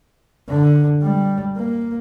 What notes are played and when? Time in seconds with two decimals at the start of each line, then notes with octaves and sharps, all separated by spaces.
0.49 D3
1.02 G3
1.57 A#3